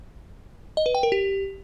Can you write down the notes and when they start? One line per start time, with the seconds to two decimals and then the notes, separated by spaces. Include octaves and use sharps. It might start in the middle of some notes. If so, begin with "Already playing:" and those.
0.77 D#5
0.86 B4
0.95 G5
1.03 A#4
1.12 G4